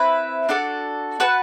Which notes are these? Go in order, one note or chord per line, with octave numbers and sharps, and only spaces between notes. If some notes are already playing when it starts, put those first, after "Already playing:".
Already playing: C4 E4 B4 E5
D4 F#4 A4 D5
F#4 B4 F#5 A5